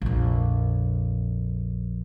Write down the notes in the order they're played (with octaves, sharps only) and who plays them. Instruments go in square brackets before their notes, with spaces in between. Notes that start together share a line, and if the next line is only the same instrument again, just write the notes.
[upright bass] A#1 F2